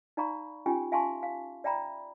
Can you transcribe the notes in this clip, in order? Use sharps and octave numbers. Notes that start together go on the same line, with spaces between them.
D#4 D5 F5 A#5 B5 C#6
C#4 D#4 F4 G4 G5 G#5
E5 F5 G#5 A5 C6 C#6
F5
D5 E5 G5 A#5 B5